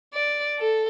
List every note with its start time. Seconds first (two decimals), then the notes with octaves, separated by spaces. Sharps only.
0.14 D5
0.59 A4